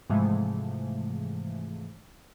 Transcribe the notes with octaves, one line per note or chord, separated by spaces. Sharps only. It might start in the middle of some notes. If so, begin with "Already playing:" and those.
G#2 C3 E3 F3 G#3 A3